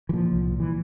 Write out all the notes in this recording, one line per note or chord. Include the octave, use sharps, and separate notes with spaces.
E3
A#2 F3
C2
A#2
E3